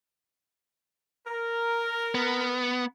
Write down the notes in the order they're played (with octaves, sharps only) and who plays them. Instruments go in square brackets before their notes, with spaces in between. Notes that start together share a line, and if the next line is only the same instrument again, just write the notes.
[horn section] A#4
[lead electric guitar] B3